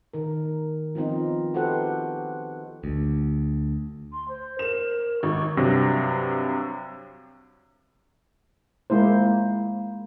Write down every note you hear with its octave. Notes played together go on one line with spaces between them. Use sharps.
D#3 A#4
F3 B3 C4 D#4 F4
F#4 G4 A4 B4 C5 F#5
D2
C6
C5
A#4 E7
G#1 C#6
G2 C3 F#3 A#6
G#3 A#3 E4 C5